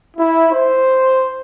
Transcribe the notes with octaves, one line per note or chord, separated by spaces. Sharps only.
E4
C5